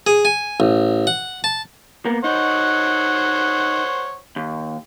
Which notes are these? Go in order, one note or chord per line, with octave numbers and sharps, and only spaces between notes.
G#4
G#5
A1
F#5
A5
A#3 B3
D#4 C5 C#5 F#5
D#2